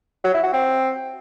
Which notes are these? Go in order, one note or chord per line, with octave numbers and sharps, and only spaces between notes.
F#3
E4
F#4
C4